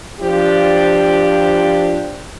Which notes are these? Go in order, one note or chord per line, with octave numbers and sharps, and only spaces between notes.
F3 D4 F4 G4